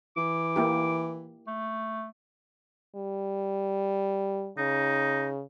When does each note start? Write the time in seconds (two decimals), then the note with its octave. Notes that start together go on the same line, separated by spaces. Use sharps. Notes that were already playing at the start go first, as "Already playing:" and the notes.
0.17 E3 D6
0.56 A#3 E4 G4
1.48 A3
2.96 G3
4.58 C#3 D#4